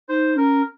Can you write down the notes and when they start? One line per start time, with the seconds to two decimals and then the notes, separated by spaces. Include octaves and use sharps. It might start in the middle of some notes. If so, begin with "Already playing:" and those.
0.09 D#4 C5
0.36 C#4 A#4